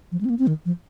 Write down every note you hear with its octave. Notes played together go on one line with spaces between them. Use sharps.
F3
G#3
C4
A#3
C4
D#3
F3